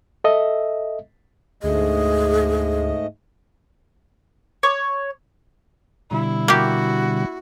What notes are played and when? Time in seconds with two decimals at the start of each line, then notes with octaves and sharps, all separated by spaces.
0.24 A4 D#5 E5
1.63 D2 G#2 A3 G#4 D#5
4.63 C#5
6.11 B2 D3 G3 E4
6.48 A#3 F#4 G4